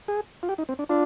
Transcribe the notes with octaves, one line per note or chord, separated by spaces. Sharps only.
G#4
F4
G4
D#4
C4
D4
D4 F4